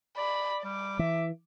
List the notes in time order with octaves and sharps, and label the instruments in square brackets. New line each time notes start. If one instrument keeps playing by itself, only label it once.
[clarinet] D5 [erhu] B5
[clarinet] G3 [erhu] D6
[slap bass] E3 [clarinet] E5